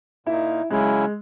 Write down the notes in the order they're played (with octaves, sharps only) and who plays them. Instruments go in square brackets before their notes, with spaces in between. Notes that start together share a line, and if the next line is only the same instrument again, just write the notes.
[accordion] A#2 A#3 D#4 [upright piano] E4
[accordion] C#3 F#3 C#4 E4 [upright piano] G#3